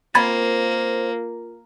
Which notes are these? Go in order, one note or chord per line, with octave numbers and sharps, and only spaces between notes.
A#3 C4 F4 A#4 C5 B5 G#6 A6